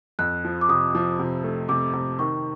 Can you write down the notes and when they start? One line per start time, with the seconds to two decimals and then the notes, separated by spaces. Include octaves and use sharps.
0.19 F2 F#6
0.45 F3
0.61 D6
0.69 C3 D#6
0.95 F3
1.19 C3
1.44 A3
1.69 C3 D6
1.93 C3
2.19 D#3 C#6